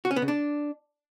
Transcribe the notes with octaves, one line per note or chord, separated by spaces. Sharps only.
F#4
C#4
B3
C#3
D4